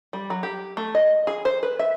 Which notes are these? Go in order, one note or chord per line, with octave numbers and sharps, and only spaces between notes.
G3
F#3
G4
A3
D#5
G#4
C5
B4
E5